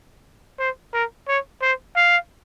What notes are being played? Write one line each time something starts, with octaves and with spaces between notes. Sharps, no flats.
C5
A#4
C#5
C5
F5